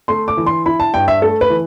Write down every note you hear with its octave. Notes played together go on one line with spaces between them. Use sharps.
A3 C6
D6
E3
C6
E4 B5
A5
G2 G5
E5
A3 A4
B4
E3